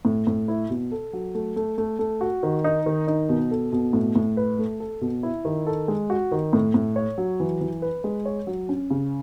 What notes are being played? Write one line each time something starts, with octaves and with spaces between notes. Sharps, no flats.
A2
A2
E4
B2
A4
F#3
A3
A3
A3
A3
F#4
D#3
D#4
D#3
D#4
B2
A4
B2
A2
A2
B4
A3
A4
B2
E4
D#3
A4
G#3
F#4
D#3
A2
A2
C#5
F#3
E3
E3
B4
G#3
C#5
F#3
C#4
C#3